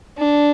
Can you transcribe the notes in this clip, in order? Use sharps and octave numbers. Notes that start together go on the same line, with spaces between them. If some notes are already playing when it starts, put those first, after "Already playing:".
D4